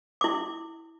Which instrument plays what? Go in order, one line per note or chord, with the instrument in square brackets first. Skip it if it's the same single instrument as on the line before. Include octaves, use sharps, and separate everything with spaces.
[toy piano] E4 D6